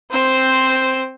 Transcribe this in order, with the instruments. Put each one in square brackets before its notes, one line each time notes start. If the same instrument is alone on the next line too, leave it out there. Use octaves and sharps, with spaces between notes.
[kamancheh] C4 C5